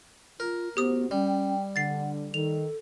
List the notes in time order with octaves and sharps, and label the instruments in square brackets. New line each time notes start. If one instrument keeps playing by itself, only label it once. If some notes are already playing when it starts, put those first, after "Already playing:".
[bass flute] F4 [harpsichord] A#4
[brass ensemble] A1 F#4 C5 [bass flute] B3 [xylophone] G4 D#6
[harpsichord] G3 [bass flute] C#4 [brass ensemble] G5
[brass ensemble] D3 [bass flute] F#5 [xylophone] A6 C7
[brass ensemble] D#3 [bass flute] A4 [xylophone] F7